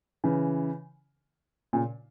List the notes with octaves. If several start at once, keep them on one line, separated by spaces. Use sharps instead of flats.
C#3 E3
A#2 C#3